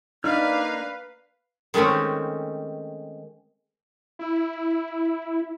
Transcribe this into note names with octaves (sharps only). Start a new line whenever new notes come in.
A#3 D4 D#4 B4 D5 F5 F6
D#3 G#3 A3 C4 C#4
E4